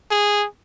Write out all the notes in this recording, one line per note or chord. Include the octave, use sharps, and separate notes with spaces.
G#4